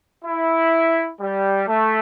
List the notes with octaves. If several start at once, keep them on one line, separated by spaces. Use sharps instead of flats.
E4
G3
A3